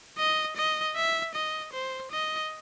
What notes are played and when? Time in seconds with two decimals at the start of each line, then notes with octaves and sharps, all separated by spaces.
0.18 D#5
0.57 D#5
0.96 E5
1.34 D#5
1.73 C5
2.12 D#5